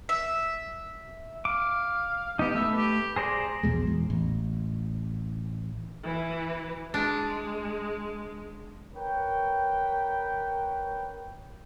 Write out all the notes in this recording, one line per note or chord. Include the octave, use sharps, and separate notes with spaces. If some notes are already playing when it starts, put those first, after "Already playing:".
E5
F5 D6
B3 D#4 G4
A3 B4 E5
G4
G#4 C5 D5 A#5
A#1 E2 B2 G#3
E2
A1
E3
G#3 D4
A#4 B4 C#5 G5